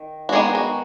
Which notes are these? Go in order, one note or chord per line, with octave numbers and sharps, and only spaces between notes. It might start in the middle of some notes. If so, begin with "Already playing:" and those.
Already playing: D#3
F#4
D#3 G#3 B3 D#4 G#4
F#4